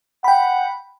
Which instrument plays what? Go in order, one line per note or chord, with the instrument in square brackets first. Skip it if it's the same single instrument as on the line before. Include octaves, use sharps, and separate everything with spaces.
[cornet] F#5 [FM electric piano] G5 B5